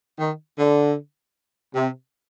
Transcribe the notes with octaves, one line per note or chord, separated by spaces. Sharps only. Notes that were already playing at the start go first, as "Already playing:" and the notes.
D#3
D3
C3